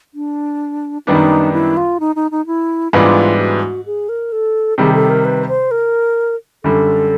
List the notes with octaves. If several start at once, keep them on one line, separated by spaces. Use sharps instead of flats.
D4
F#2 D#3 G3 B3 D4 D#4
E4
F4
D#4
D#4
D#4
E4
G#2 E3 G3 B3 D4 F4
F#4
G#4
A#4
A4
C3 D#3 G3 G#4
A4
A#4
B4
C5
A#4
F#2 D3 G3 A4